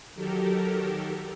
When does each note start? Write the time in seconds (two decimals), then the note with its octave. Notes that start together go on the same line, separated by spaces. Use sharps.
0.15 D#3 F#3 G4 A4 A#4